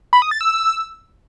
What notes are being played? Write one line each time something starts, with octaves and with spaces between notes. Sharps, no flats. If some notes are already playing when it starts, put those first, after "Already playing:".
B5
D#6
A6
E6